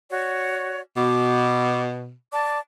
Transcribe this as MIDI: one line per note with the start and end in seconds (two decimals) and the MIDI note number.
0.11 0.80 66
0.11 0.80 73
0.11 0.80 74
0.97 2.13 47
0.97 1.82 86
2.32 2.58 74
2.32 2.58 81
2.32 2.58 86